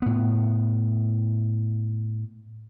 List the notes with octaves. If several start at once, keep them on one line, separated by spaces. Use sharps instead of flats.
A2 B3